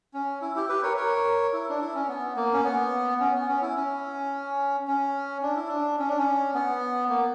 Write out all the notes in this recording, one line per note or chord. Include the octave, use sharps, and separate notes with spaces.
C#4
E4
E4 G4
G4 B4
A#4 C#5
A#4 C#5
E4
D4
E4
C#4
B3
A#3
C#4
B3
C#4
B3
C#4
E4
C#4
C#4
D4
E4
D4
C#4
D4
C#4
B3
A#3